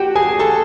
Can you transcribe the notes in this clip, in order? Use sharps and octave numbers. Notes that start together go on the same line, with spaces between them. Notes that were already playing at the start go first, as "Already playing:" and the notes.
Already playing: F#4 G4 F#5 G5
G#4 G#5
A4 A5